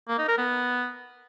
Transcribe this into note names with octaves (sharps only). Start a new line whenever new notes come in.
A#3
D#4
A#4
B3